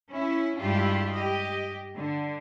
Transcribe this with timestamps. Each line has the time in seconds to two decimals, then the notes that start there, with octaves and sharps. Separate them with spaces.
0.11 C#4 E4
0.58 G2 G#3 E4 F4 G4
1.14 G4 D#5
1.95 D3